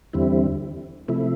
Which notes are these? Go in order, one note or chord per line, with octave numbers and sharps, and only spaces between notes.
E2 D3 G3 C4 E4
C3 F3 A3 E4